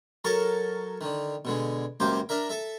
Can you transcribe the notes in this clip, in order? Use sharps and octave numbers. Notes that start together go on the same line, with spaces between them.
F#3 A4 A#4 A5 C#6
D3 D#3
B2 D3 G#3
C#2 F#2 A#3 G4 C5
D4 A#4 E5
A4 E5